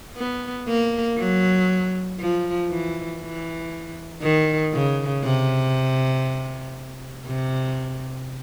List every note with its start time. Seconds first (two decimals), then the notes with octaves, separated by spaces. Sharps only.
0.17 B3
0.68 A#3
1.18 F#3
2.20 F3
2.70 E3
3.21 E3
4.23 D#3
4.73 C#3
5.24 C3
7.27 C3